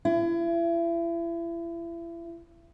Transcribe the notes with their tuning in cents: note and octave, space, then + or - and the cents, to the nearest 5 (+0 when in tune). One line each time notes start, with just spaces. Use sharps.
E4 +35